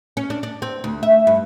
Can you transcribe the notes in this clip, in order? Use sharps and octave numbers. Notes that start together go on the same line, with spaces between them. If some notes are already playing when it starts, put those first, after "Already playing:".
C#4
D4
D4
C4
D2
E5
G2